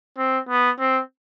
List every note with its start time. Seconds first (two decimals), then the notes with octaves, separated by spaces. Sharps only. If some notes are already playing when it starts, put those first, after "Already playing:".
0.18 C4
0.49 B3
0.79 C4